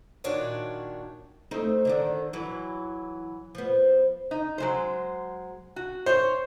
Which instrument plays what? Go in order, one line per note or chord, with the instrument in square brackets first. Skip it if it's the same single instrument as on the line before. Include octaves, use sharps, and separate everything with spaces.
[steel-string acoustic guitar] A#2 D#3 D4 F#4 C#5 A5
[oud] A3 C4 D#4
D3 D#3 D4
E3 F#3
F3 B3
[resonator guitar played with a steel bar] D#4
F#3 G#3 C5
F#4
[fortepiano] C5 [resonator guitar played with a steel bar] C#5